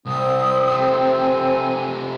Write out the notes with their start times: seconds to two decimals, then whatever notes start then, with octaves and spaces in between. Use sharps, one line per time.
0.06 C2 C4 D#6
0.69 C3 A3
1.21 G#5